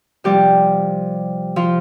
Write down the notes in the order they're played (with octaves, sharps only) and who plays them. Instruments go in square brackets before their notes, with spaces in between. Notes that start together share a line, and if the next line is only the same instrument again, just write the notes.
[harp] C3 F3 G3 G4
F3 F4